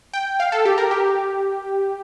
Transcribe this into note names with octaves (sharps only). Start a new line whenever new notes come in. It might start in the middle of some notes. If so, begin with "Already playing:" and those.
G5
F5
A4
G4
A#4
G4